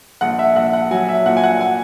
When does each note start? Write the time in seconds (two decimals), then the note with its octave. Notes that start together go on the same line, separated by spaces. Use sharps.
0.21 A#1 F#5
0.39 E5
0.56 A#1 F#5
0.73 F#5
0.91 F#3 G#5
1.09 E5
1.26 A#2 F#5
1.37 G#5
1.44 F#5
1.61 G#5